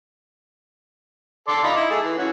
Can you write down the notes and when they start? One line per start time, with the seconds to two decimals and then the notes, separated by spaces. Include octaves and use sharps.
1.48 A4 D5 C6
1.64 D#4 F4 B5
1.76 E4 D#5
1.91 A3 G#4
2.04 E3
2.18 E3 C#4 F#4